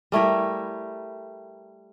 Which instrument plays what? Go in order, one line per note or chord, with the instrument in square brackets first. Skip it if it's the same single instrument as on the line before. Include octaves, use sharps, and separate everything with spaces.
[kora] G3 A3 E4 A#4